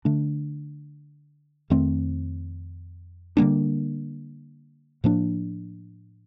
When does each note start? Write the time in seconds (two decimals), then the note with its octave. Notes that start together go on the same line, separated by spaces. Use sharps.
0.05 D3 A3 D4
1.70 F2 D#3 A3 C4
3.37 D3 G3 A#3 D4
5.04 A2 F3 A#3 D4